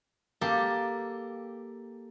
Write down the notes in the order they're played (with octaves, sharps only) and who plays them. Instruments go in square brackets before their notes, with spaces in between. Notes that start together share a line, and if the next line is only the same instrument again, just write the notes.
[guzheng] A#3 G4 A4